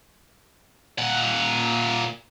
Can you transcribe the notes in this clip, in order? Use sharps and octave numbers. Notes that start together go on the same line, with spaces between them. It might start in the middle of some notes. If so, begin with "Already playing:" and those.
A#2 F#5